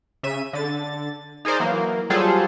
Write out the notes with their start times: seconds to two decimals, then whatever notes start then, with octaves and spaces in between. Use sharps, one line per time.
0.23 C#3 E5 D#7
0.53 D3 A6
1.45 D#4 G#4 A#4 C5 D5
1.60 E3 F#3 A#3
2.10 F#3 G3 F4 G#4 A4 C5